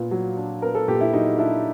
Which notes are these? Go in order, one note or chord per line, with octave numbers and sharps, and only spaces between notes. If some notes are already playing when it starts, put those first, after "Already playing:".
Already playing: A#2 B3
F#3
D4
B3 A#4
A4
A#2 G4
E4
F#3 D#4
D4 E4